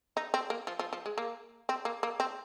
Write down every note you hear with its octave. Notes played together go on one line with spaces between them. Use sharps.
D#4
C4
A#3
F3
F3
F3
G#3
A#3
C4
A#3
A#3
C4